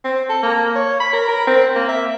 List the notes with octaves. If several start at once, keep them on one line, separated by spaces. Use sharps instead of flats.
C4
A4
A#3
C#5
B5
A#4
A#4
C4
A#3
E5